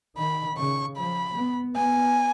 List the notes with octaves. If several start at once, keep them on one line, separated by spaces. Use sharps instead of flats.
D#3 B5
C#3 C#6
F3 B5
B3
B3 G#5